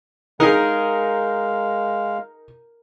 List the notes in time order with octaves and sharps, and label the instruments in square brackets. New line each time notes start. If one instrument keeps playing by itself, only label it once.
[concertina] G#3 F5 [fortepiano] D#4 G#4 [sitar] A#4